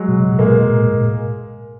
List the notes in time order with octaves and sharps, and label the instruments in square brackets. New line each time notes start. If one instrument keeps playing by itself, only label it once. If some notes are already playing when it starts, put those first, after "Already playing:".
Already playing: [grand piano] F#3 G#3
[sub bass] B2
C3
B2
[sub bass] B2 [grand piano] G#3 A#3
[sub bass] A#2
A2